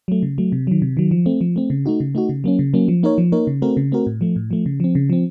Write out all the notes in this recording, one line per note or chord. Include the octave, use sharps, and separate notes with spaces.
F#3 A3
C#3
F#3 A3
C3
D#3 F#3
C3
D#3 F#3
F3
A3 C4
F3
A3 C4
C#3
A3 D#4 F#4
C#3
A3 D#4 F#4
C#3
F#3 A#3 C#4
C#3
F#3 A#3 C#4
F3
A#3 D#4 A#4 C#5
F3
A#3 D#4 A#4 C#5
C#3
A3 C4 F#4 A#4
C#3
A3 C4 F#4 A#4
A2
F3 A3
A2
F3 A3
C#3
F3 C4
C#3
F3 C4